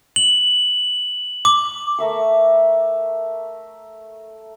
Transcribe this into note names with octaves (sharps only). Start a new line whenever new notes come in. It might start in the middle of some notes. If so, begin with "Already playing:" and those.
F#7
D6
A3 A#4 E5 C#6